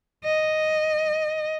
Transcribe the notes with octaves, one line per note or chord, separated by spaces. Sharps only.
D#5